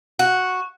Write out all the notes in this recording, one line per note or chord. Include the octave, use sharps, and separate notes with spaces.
F#4